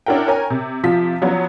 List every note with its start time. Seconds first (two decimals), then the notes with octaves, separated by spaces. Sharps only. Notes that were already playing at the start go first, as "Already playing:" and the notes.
0.06 C#4 D4 E4 A#4 F#5 G5
0.28 A#4 C#5 G5 G#5 A#5
0.50 C3
0.83 C3 F3 F4 B6
1.22 F3 F#3 B3 C#4